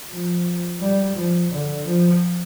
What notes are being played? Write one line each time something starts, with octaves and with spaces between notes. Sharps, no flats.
F3
G3
F3
D3
F3